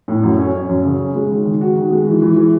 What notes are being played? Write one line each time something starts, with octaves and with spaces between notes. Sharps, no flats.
A2
F#2
C#4
C#4
F#2
C#3
C#4
G#3
D#3
D#3
F#4
D#3
G#3
E3
E3
E3